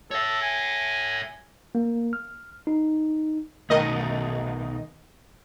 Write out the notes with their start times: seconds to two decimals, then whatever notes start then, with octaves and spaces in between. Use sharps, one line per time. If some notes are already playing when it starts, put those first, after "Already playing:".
0.11 A4 C#5 E5
0.42 G#5
1.75 A#3
2.13 F6
2.67 D#4
3.70 B1 D#3 A3 D#5